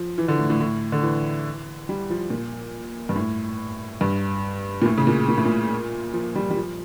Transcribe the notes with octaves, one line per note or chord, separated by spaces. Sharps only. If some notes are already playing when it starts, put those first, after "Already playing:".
Already playing: F3
E3
D3
A2
A2
A2
D3
E3
G3
F3
A#2
G2
A2
G2
A#2
A2
C#3
A#2
A#2
A2
A#2
F3
G3
G3
F3